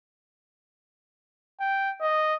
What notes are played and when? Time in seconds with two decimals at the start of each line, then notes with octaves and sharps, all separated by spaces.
1.60 G5
2.01 D#5